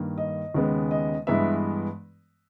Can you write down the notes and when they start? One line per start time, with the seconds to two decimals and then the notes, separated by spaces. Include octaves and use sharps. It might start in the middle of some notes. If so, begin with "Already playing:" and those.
Already playing: G2 D#3 A#3
0.18 D#5
0.54 D#2 C#3 G#3 B3
0.91 D#5
1.27 G2 E3 G#3 B3 E5